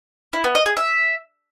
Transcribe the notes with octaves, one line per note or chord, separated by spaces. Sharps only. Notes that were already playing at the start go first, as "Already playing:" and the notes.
E4
B3
D#5
G#4
E5